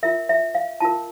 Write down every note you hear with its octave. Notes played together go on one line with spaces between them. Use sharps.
F4 A#4 E5
E5
F5
F4 A#4 A5